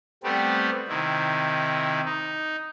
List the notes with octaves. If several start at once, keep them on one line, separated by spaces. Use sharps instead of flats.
G3 A3 B3 C4 G4
C3 D#3 E4
D#4